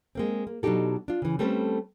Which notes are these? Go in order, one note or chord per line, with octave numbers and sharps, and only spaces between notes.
G#3 A#3 C4
A#3
B2 F#3 D4 D#4 G4 A4
D4 F4
C#3 E3
G3 A3 C4 C#4 A4 B4